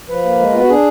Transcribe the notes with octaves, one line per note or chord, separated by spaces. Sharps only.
F3 B4
A#3
G#3
B3 F4
F#4
D4 G#4